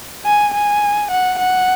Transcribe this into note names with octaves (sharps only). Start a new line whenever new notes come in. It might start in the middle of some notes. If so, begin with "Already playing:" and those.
G#5
G#5
F#5
F#5